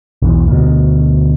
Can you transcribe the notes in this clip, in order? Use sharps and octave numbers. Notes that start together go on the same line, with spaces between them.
B1 E2
D2 B2